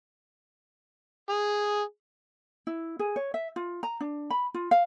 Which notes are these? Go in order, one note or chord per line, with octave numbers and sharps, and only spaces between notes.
G#4
E4
G#4
C#5
E5
F4
A#5
D4
B5
F4
F5